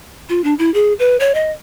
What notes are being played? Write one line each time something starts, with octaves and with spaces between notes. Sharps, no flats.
F4
D4
E4
G#4
B4
C#5
D#5